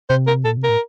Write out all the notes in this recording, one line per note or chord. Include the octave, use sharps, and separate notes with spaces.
C3 C5
A#4
A#2 A4
C3
A#4
A2